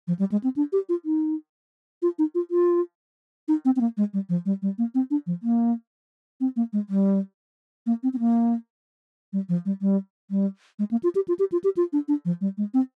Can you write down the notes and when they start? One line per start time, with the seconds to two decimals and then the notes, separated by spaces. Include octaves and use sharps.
0.08 F3
0.19 G3
0.32 G#3
0.44 C4
0.56 D4
0.73 G4
0.89 F4
1.05 D#4
2.02 F4
2.19 D#4
2.35 F4
2.51 F4
3.48 D#4
3.65 C4
3.76 C4
3.81 A#3
3.97 G#3
4.14 G3
4.29 F3
4.46 G3
4.62 G3
4.78 A#3
4.95 C4
5.11 D4
5.27 F3
5.43 A#3
6.41 C4
6.56 A#3
6.73 G#3
6.89 G3
7.86 A#3
8.03 C4
8.13 C4
8.19 A#3
9.33 G3
9.49 F3
9.66 G3
9.81 G3
10.31 G3
10.79 G#3
10.91 A#3
11.03 F4
11.15 G4
11.28 F4
11.39 G4
11.52 F4
11.64 G4
11.77 F4
11.93 D4
12.08 D4
12.25 F3
12.41 G3
12.58 G#3
12.74 C4